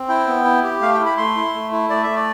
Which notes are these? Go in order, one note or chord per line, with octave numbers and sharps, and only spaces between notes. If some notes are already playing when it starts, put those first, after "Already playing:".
Already playing: C4
E4 G5
B3
E4
G4
A3 F5
G5
E4
B5
A3 C6
E4
A3
E4
A3 D5
E5
A3
D5